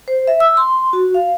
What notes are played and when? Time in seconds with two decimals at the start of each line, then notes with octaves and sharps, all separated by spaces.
0.08 C5
0.27 E5
0.40 E6
0.57 C6
0.93 F#4
1.14 F5